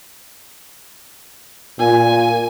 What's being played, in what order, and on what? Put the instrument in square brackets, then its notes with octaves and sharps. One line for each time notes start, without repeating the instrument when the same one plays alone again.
[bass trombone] A#2 [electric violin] G#5